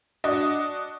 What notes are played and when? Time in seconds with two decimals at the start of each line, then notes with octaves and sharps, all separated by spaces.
0.24 D4 F#4 D#5